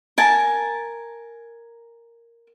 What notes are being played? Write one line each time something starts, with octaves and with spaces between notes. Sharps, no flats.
A#4 G#5 A5